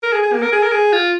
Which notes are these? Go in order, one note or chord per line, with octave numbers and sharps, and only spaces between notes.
A#4
G#4
G#4
A#3
A#4
G#4
A#4
G#4
F4